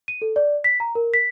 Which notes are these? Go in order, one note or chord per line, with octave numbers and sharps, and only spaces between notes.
D#7
A4
D5
B6
A#5
A#4
B6